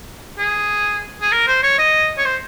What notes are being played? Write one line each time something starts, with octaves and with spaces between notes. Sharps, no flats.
G#4
G#4
A#4
C5
C#5
D#5
C#5
C5